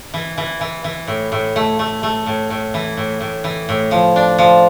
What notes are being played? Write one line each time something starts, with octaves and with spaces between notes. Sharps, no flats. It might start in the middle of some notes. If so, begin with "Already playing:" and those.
E3
E3
E3
E3
A2
A2
A3
A3
A3
A2
A2
E3
A2
A2
E3
A2
F3
D4
F3